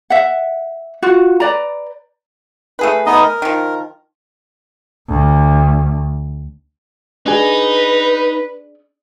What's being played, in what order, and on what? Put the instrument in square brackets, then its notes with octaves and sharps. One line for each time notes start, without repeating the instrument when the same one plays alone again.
[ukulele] E5 F#5
F4 F#4
B4 D5 A#5
[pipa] A3 G#4 B4
[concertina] B3 D#4 D#5
A#4
[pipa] D#3 F3
[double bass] D2
[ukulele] D4 G#4 [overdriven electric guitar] D#4 [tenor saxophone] B4